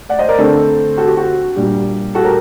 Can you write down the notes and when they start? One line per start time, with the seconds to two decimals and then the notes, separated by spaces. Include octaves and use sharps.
0.09 D5 F#5
0.19 C5 D#5
0.29 A#4 D5
0.38 D3 A3 C4 A4 C5
0.97 F#4 A4
1.07 G4
1.17 F#4
1.56 A#2 G3 D4 G4
2.15 F#4 A4
2.24 G4 A#4